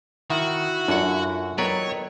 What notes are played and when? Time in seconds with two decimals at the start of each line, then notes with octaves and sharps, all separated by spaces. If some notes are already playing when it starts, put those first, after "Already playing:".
0.30 D#3 E4 F#4
0.88 F#2 D4 F4 A4 F#5
1.58 D#3 F#3 B3 A4 B4 C#5 D5 A#5